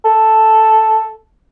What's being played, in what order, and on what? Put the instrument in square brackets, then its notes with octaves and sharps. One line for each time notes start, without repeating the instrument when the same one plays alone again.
[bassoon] A4